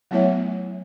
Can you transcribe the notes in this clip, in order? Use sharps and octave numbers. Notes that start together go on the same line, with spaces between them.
F#3 A3 B3 E4 C#5 E5